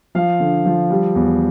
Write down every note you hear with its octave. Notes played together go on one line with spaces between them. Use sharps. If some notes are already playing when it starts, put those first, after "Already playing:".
F3 F5
D3
F3
G3
E2